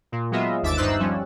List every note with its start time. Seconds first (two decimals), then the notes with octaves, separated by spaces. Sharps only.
0.12 A#2
0.31 F#3 G#3 B3 F4 D#5 E5
0.62 G1 D#2 E5 D6 A6
0.77 G2 D#4 C5 E6 F#6
1.00 F3 G3 C#4